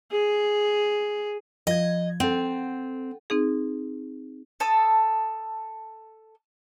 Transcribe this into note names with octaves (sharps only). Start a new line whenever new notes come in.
G#4
F3 D#5 G#6
C4 A4 F#5
C4 D#4 G#4
A4 A5 D#6